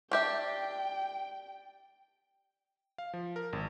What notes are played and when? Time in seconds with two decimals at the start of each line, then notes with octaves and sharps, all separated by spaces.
0.11 D4 G4 E5 G5
2.98 F5
3.13 F3
3.36 A#4
3.53 G#1